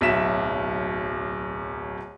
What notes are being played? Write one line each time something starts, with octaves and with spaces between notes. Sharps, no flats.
D1 B1 F#3 E5 B6 E7